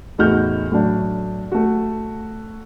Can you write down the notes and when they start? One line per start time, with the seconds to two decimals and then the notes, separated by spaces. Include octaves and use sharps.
0.18 E2 A2 D#4 F#4 F6 G6
0.72 A2 F#3 D4
1.52 A3 F#4